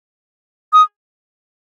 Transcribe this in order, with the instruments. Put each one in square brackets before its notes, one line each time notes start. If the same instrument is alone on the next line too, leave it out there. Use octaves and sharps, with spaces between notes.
[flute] D#6